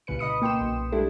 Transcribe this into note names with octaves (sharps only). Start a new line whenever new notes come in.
C2 A#2 C#3 B4 C#7
D#5 B5 D#6 C#7
A#3 G5 C6 E7
B1
G3 G#3 D4 E4 G4 A4